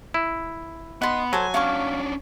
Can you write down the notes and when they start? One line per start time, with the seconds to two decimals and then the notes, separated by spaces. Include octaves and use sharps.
0.14 E4
1.02 B3 D#4 F#5 C6
1.33 F#3 A4 C5 G#5
1.54 C#4 D4 F5 G#5 C#6